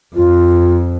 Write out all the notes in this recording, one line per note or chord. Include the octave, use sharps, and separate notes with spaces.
F2 F4